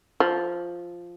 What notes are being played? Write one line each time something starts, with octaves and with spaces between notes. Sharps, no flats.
F3